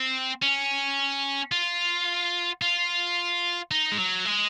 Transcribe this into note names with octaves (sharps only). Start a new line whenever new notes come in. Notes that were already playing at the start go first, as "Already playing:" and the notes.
Already playing: C4
C#4
F4
F4
D#4
G#3
F#3
G#3